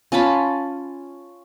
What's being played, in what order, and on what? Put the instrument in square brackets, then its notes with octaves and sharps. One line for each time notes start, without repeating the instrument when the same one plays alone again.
[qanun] C#4 F4 A5 B5